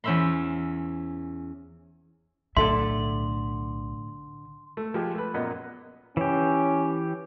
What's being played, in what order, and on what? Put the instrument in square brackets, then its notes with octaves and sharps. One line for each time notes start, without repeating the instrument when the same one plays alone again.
[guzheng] E2 C#4 C5 E5 B5 C6
[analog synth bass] B1 [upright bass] A2 [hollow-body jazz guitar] D3 A4 E5 [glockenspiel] C6
[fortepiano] A3
F3 G#3 G4
A3 B4
F#2 A#2 B3 A#4 D#5
[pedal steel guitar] E3 G4 [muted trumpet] C#4